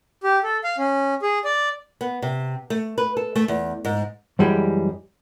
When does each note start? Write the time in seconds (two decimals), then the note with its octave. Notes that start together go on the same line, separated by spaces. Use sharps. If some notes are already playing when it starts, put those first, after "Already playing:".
0.23 G4
0.43 A4
0.64 F5
0.78 C#4
1.22 G#4
1.45 D5
2.01 B3
2.22 C3
2.70 A3
2.98 B4
3.17 A4
3.36 A3
3.48 E2
3.85 G#2
4.39 F#2 E3 G3 G#3 G4 G#4